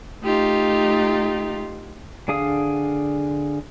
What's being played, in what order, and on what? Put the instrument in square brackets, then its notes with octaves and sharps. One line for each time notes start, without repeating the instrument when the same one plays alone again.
[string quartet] A3 D#4 F4 G4
[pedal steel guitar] D3 D4 G#4 F5 D#6